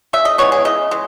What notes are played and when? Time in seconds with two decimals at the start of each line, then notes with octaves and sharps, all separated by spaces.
0.13 C#3 E5
0.25 D#5
0.38 E3 G#3 B3 C#5
0.52 G#4
0.65 C#3 D#5
0.91 E3 G#3